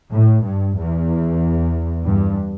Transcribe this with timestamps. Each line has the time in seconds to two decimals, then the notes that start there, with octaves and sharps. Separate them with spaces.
0.10 A2
0.43 G2
0.76 E2
2.06 G2